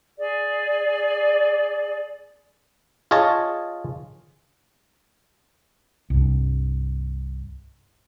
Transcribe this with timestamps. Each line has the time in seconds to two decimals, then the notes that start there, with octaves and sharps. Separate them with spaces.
0.17 G#4 D5
3.11 F4 G#4 C#5 D#5 A5
6.10 C2 G2